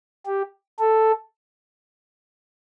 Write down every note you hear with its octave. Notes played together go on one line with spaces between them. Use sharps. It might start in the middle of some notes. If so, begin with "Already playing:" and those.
G4
A4